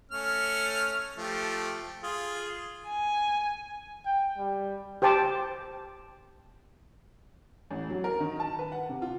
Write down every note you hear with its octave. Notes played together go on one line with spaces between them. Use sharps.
A3 C#4 F6
F3 A3 G4
F4 G#4
G#5
G5
G3
G4 C5 G5 A5 D6
A1
F#3
A#4
D#3
A5
B4
F#5
C3
F4